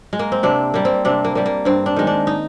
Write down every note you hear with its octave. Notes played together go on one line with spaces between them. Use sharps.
G#3
A#3
C4
C3 D4
G3 A#3
C4
C3 D4
A#3
G3 A#3
A#3
G2 C4
D4
D#3 G#3
D4
D#4